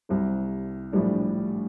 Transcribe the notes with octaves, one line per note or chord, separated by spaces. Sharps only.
C2 C3 G3
A#1 A2 G3 D4